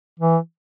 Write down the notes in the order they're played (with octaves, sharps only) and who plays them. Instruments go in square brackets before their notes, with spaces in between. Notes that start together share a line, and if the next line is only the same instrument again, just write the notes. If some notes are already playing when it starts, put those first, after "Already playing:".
[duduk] E3